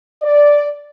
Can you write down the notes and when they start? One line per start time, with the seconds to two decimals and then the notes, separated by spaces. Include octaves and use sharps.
0.22 D5